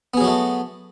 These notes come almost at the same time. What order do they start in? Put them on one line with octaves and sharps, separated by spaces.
B3 G#4 F#3 F#4 A3